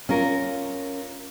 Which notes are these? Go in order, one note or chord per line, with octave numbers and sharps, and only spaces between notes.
C#4 F4 A#4